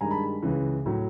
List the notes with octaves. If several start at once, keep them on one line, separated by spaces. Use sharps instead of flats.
G2 D#3 G#3 G#5 A#5
A5 B5
C#2 C#3 E3
A2 F#3